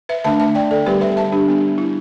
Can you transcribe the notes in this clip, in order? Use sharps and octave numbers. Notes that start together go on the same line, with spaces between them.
B4 E5
D3 A3 D4 E5 A5
E5 A5
D5 G5
A4 D5
D3 G3 B3 G4 B4
B4 E5
E5 A5
D4 G4
G3 B3 D4
E4